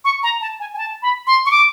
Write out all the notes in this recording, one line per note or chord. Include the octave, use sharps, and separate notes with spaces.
C#6
A#5
A5
G#5
G#5
A5
B5
C6
C#6
D6